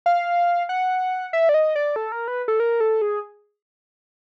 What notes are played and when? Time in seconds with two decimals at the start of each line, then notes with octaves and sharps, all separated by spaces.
0.06 F5
0.69 F#5
1.33 E5
1.49 D5
1.54 D#5
1.76 D5
1.96 A4
2.12 A#4
2.28 B4
2.48 A4
2.60 A#4
2.80 A4
3.02 G#4